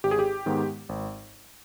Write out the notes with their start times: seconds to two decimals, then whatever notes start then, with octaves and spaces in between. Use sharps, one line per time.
0.04 G#1 G4
0.11 G#4
0.19 G4
0.46 G#2 D#3 G#3 B3
0.89 G#1